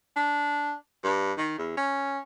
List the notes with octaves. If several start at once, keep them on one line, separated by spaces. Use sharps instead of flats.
D4
G2
D#3
E2
C#4